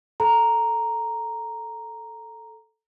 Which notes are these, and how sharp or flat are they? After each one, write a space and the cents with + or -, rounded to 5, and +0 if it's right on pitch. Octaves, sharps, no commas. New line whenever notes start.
A4 +0 A#5 +0